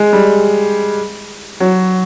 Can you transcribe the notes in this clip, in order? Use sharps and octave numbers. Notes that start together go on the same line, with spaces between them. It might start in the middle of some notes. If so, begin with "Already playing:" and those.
Already playing: G#3
G3
F#3